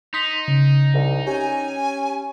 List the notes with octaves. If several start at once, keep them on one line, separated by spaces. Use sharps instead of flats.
D#4 C6 D#6 B6
C#3
C2
C#4 G4 G#5